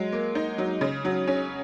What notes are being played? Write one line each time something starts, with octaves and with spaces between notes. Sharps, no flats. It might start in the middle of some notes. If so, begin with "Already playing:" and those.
Already playing: F#3 G#3
A#3
D#4
F#3
C#3
F#3
C#4